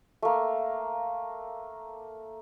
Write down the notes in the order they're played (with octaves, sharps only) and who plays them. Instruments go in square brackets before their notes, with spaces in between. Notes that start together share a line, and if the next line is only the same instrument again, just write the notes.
[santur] A3 A#3